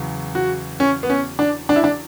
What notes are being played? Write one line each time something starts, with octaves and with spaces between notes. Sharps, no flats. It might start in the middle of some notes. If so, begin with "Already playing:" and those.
Already playing: E2 C#3 F#3
F#4
C#4
B3
C#4
D4
D4
E4
D4